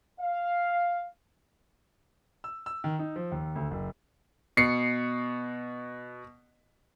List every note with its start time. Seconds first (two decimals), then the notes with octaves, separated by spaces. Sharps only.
0.19 F5
2.44 E6
2.66 E6
2.84 D#3
2.99 D#4
3.16 F3
3.32 D#2
3.55 D2
3.71 F#1
4.57 B2 C7 C#7